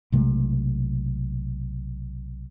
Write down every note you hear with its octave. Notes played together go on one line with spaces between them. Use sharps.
B1 C3 G#3 A3